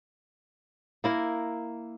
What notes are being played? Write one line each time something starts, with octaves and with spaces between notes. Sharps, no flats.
A#3 E4 A#4